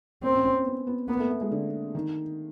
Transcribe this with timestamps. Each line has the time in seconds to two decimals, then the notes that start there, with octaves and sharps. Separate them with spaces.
0.23 A#3 C4
0.34 C#4
0.44 C#4
0.55 C4
0.66 B3
0.87 B3
1.08 A#3 B3
1.20 A3
1.30 A3
1.41 G#3
1.52 D3
1.95 D#3